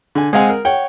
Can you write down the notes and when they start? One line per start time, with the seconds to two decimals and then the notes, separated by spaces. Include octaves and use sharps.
0.15 D3 G#5
0.33 G#3 C4 F5 F#5 G#5
0.49 A#4
0.65 C#5 F#5 G5